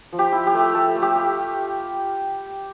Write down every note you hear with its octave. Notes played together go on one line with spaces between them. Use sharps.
F3
G4
E4
G4
A3
A3 A4
A3
G4
F4